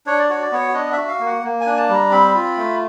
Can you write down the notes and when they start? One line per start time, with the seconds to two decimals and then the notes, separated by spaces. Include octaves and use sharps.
0.06 D4 C#5
0.19 D5
0.30 F#4 C#5
0.42 D5
0.52 B3 C#5
0.74 D4 D#5
0.92 E5
0.97 F#4
1.08 F5
1.20 A#3
1.26 F#5
1.43 A#3
1.61 G#5
1.66 D4
1.78 A5
1.89 G3 A#5
2.11 C4 B5
2.35 F4
2.57 A3